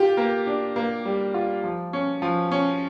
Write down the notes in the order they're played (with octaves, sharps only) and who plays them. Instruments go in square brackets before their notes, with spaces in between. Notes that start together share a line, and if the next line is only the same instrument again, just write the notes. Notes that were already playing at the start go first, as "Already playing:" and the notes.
Already playing: [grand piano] F4 [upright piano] G4
[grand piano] A#3
D4
A#3
G3
F4
F3
C#4
F3
C#4